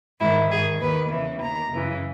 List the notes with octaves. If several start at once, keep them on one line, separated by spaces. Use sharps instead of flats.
G#2 D#3 E4
G#2 D#3 G#4
D#2 D#3 B4
E2 C#3 E3
D#2 D#3 A#5
F#2 C#3 E3